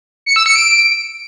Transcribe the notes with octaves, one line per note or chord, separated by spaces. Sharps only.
C#7
E6
C#7
D7